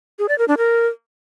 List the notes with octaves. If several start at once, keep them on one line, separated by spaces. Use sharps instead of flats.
G#4
D5
A#4
D4
A#4